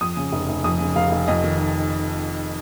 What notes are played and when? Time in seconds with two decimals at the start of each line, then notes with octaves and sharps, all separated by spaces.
0.01 F2 D#6
0.17 C#3
0.32 F1
0.48 F1
0.64 F2 D#6
0.80 C#3
0.96 F1 F5
1.12 F1
1.28 F2 D#5
1.44 D#3